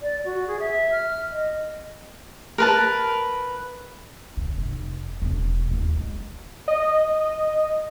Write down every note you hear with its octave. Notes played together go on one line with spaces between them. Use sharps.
D5
F#4
G#4
E5
F6
D#5
A#4 B4 A5
D3
F1
E1
D#2
G#3
D#5